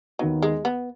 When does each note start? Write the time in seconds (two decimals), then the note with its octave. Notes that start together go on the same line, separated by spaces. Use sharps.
0.19 D#2 D#3 F#3 B3 D#4
0.42 G#3
0.65 B3